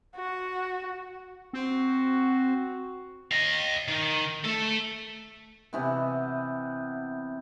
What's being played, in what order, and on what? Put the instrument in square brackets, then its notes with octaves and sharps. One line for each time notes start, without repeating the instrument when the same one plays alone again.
[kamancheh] F#4
[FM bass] C4 [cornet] F#4
[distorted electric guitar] D#5 F5
D#3
A3 A4
[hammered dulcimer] C3 E3 B3